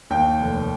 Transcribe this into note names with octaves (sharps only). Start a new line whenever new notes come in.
D#2 G5
F1